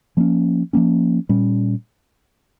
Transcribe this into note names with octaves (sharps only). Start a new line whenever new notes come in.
F3 A#3 C#4
F3 A#3 C#4
A#2 G3 C#4